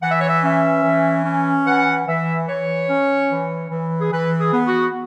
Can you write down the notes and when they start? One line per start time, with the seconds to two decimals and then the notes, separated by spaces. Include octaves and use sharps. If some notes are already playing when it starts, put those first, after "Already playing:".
0.02 E3 F#5
0.11 E5
0.20 C#5
0.29 E5
0.43 C#4 E5
0.84 E3
1.25 C#4
1.66 E3 F#5
2.07 E3 E5
2.48 E3 C#5
2.89 C#4
3.30 E3
3.71 E3
4.00 G#4
4.12 E3 B4
4.39 G#4
4.52 B3
4.66 F#4